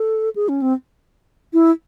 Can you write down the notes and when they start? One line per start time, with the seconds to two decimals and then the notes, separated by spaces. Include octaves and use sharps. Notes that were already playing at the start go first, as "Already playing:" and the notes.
Already playing: A4
0.36 G#4
0.49 C#4
0.62 C4
1.53 E4